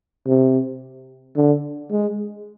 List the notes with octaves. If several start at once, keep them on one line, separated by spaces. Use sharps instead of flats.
C3
D3
G#3